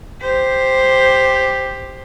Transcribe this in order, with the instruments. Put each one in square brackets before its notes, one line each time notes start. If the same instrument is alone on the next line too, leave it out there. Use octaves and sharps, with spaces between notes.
[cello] G4 C5